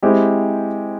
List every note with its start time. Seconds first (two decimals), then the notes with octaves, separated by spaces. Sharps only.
0.03 G#3 C4 E4 G4